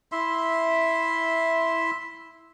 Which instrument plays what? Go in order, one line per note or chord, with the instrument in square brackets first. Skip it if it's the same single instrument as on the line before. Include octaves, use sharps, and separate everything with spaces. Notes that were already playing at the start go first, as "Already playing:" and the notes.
[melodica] E4 E5 C6